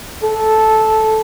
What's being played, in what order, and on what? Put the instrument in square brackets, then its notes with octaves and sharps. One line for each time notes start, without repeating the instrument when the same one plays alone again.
[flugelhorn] A4